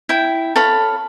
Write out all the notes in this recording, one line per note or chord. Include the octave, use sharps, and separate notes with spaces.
E4 G5
A4 C#5 F5 B5